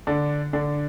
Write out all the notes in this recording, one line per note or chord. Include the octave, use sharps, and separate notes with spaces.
D3 D4
D3 D4